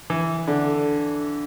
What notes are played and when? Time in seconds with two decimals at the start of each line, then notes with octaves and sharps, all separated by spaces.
0.10 E3
0.48 D3